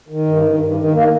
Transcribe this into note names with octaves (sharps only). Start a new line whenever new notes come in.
D#3
G2
D#3
G2
D#3
A#3